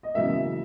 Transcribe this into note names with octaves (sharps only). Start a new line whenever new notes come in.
D#5
E2 C#3 F#3 A#3 E5